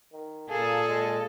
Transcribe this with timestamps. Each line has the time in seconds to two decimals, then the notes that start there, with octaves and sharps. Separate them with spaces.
0.12 D#3
0.50 A#2 A#3 G#4 A4 A5
0.88 G#3